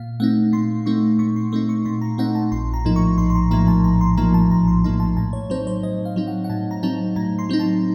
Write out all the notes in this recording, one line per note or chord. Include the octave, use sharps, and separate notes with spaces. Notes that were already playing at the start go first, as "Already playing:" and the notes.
Already playing: A#2 F5
A3 C4 D#4 F#5
A#2 C6
A3 C4 D#4 C#6
A#2 C#6
C6
A3 C4 D#4 C6
C#6
A#2 C6
A#5
A3 C4 D#4 F#5
A5
A#1 C6
A#5
A2 F3 A#3 D#4
C#6
A#1 C6
C6
A#5
A2 F3 A#3 D#4 A#5
A5
A#1 A#5
C6
A2 F3 A#3 D#4 A#5
A5
A#1 A#5
C6
A2 F3 A#3 D#4 C6
A5
A2 A5
C#5
F#3 C4 D#4 C5
C5
A2 D#5
F5
F#3 C4 D#4
F#5
F#5
A2 A5
A#5
F#3 C4 D#4 A5
A2 A#5
C6
F#3 C4 D#4
A5